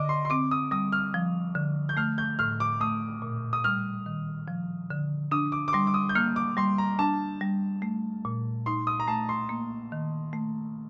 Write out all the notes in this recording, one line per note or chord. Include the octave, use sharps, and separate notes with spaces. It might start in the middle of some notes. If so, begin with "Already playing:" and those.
Already playing: D3 D#5 D6
C6
C6
C4 D6
D#6
G3 D#6
F6
F3
D3
G6
A3 F6
G6
A2 F6
D6
A3 D#6
A#2
D#6
G3 F6
D#3
F3
D3
D4 D#6
D6
D6
G3 C6
D6
D#6
G6
A#3 F6
D6
G3 C6
A#5
D4 A5
G3
A3
A#2
D#4 C6
D#6
A#5
A3 A5
C6
A#3
D#3
A3